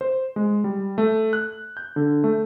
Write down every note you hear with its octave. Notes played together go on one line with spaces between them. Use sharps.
C5
G#3
G3
A3
F#6
G6
D3
A3